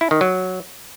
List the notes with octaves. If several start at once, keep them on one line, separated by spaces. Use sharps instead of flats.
E4
D#3
F#3